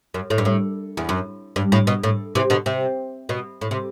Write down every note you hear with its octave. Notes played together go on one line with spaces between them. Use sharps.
F#2
A2
G2
A2
E2
F#2
G2
A2
B2
A2
C3 E3
B2 D3
C3
B2
A2
C3